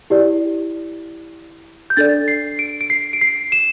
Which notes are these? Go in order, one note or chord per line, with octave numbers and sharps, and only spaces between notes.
E4 G4 D5
G6
D4 A4 D5 A6
C7
D7
D7
C7
D7
C7
E7